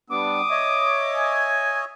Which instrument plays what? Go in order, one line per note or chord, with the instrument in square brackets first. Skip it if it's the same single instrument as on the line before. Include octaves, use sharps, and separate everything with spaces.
[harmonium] G3 B3 D4 [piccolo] D6 [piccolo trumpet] D#6
[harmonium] C#5 D#5 E5
[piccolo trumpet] G#5